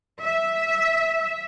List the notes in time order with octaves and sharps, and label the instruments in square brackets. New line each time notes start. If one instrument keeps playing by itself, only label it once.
[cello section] E5